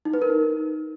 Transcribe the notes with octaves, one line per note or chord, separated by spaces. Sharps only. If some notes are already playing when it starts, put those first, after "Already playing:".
D#4
B4
A#4
D#4